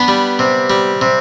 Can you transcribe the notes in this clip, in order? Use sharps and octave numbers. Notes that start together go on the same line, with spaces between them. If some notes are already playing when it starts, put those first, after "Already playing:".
Already playing: B3 D4 B4
G3
C3
G3
C3